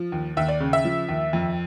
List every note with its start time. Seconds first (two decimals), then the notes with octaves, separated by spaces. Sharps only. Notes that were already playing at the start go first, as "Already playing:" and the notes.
Already playing: F3
0.12 D#2
0.37 D#2 E5
0.48 D5
0.60 C#3
0.73 E5
0.85 F3
1.09 D#2
1.33 F2